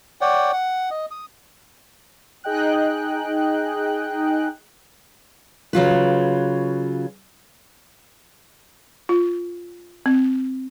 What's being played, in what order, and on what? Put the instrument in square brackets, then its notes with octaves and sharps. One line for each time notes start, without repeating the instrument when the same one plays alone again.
[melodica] C#5 D5 F#5 G5
F#5
D#5
D#6
[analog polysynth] D#4 G#4 D#5 G5 F#6
[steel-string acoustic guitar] C#3 F#3 F4 B4
[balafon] F4
C4